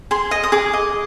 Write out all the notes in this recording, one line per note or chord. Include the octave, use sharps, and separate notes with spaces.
G#4 C6
D#5
D#6
G#4 D6
D#5